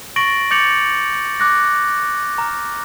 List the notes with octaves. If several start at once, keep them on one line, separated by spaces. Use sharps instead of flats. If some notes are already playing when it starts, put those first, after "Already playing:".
C#6 A6 A#6 D7 F#7
D6 G6 A6 C#7 F7 F#7
D6 F#6 A#6
A#5 F6